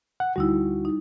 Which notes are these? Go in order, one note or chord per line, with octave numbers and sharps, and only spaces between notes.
F#5
D2 G3 D#4 E4 F#4
D#4